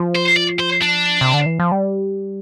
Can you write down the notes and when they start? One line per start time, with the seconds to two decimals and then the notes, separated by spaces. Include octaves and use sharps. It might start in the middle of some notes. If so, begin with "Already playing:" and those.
Already playing: F3
0.15 C5
0.36 D5
0.60 C5
0.82 D4
1.21 C3
1.34 D3
1.46 E3
1.60 F3
1.72 G3